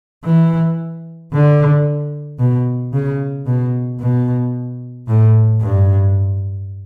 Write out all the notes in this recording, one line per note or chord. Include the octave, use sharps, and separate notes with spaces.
E3
D3
B2
C#3
B2
B2
A2
G2